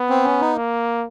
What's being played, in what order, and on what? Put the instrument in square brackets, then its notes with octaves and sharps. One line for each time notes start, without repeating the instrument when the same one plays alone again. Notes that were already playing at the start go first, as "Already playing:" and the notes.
Already playing: [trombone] B3
[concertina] C4
C#4
D#4
[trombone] A#3